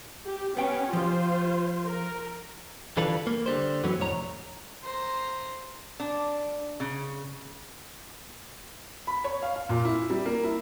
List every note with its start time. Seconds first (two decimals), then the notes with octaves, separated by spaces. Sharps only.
0.25 G4
0.57 B3 C#4 G5
0.93 F3 F4 G4 C5
1.88 A#4
2.97 D3 E3 G3 F4 A4 B4
3.27 A#3
3.46 D3 G3 C5
3.83 F#2 E3 F#3 A3 B3 C#4
3.99 C2 F2 A2 C#5 A#5
4.83 C5 A#5
6.00 D4
6.80 C#3
9.07 B5
9.24 C#5
9.42 F5
9.55 F5
9.69 A#2
9.85 E4
10.10 G3
10.26 A#3
10.44 E4